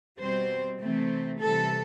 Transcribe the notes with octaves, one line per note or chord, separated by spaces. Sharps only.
B2 G3 C4 C5
C3 E3 A3 C4
C3 E3 G3 A4